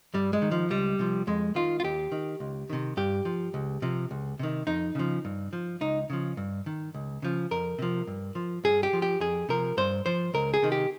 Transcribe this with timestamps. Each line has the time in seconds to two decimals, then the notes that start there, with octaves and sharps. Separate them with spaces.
0.14 G2 G3
0.33 G#3
0.42 D#3
0.51 F3
0.70 C#2 G3
0.99 C3 F3
1.27 F2 G#3
1.55 D#3 F4
1.80 F4
1.84 D#2 G4
2.12 D#3
2.40 C#2
2.70 C3 D#3
2.97 G2 G4
3.25 F3
3.54 C#2
3.82 C3 F3
4.11 C#2
4.39 C3 D#3
4.67 F2 D#4
4.95 C#3 F3
5.25 G2
5.53 F3
5.81 C#2 D#4
6.10 C#3 F3
6.37 G2
6.66 D#3
6.94 C#2
7.22 C#3 F3
7.51 F2 A#4
7.79 C3 F3
8.07 G2
8.35 F3
8.64 G2 G#4
8.83 G4
8.93 F3
9.02 G4
9.20 F2 G#4
9.49 C3 F3 A#4
9.77 G2 C5
10.06 F3 C5
10.34 C#2 A#4
10.54 G#4
10.62 C3 D#3
10.72 G4